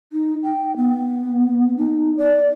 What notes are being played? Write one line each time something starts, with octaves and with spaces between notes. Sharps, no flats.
D#4
G5
B3
D#4
D5